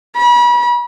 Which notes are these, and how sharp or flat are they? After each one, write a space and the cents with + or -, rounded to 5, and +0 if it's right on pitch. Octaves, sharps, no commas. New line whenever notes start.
B5 -40